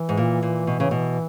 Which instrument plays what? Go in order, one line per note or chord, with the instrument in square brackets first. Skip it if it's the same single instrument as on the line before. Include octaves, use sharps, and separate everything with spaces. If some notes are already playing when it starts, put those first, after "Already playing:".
Already playing: [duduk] E3
[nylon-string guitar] G#2
A#2
A#2
B2
C#3
B2